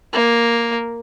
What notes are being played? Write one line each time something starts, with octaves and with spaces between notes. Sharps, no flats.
A#3